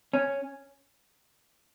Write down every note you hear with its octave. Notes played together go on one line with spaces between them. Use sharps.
C#4